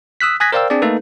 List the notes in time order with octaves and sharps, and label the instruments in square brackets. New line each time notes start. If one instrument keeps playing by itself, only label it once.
[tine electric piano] D#6 E6 F#6 B6
G#5 D#6 F#6 G#6 A#6 B6
A#4 C5 D5 F5 G5 E6
C4 D4 G#4 D5
A3 A#3 D#4 A4 B4